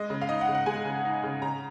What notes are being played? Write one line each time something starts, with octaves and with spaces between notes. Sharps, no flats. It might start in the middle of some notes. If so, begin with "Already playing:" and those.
Already playing: G#3 D#5
C#3
F5
D#4 D#5
F#5
C#3
F#5
G#3 G#5
C#3
D#4
C#3
C#3 A#5